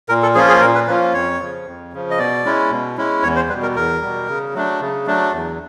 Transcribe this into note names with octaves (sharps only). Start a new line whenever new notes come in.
A#2 A#4
A4
F3 A#3 C#4 F4 G#4
G#4
A#2 A#4
B4
F3 A#3 C#4 F4 B4
F2 C#5
C#3 F3
F2
C#3 F3
D#5
B2 D5
G#3 C#4 E4
B2
G#3 C#4 E4
E2 C#5
C5
G3 B4
B2
A#4
E2 A#4
B2 G3
C#3
F#3 A3 D4
C#3
F#3 A3 D4
E2